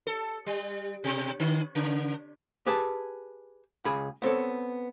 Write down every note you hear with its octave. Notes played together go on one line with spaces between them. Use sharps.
A4
G3
B2
D3
C#3
G4 G#4 B4 G#5 A5
C#2 G#4 B5
B3 C4 A4 C#5